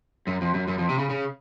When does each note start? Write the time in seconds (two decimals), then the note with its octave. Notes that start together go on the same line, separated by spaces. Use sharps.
0.27 F#2
0.41 F2
0.54 F#2
0.68 F#2
0.78 F2
0.89 C3
0.98 C#3
1.09 C#3